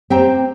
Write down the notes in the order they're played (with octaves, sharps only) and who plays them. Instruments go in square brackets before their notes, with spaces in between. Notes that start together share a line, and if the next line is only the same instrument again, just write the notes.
[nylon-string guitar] C4 [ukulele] G4 C5 G5 A#5